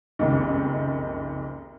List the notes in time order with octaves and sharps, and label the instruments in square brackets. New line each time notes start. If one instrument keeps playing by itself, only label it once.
[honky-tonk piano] F#1 C2 F2 D#3